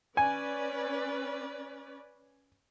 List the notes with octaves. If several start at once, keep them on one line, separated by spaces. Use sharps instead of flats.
C#4 B4 D5 G#5